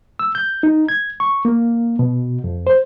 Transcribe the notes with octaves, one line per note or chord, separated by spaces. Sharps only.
E6
G6
D#4
G#6
C#6
A#3
B2
F2
C5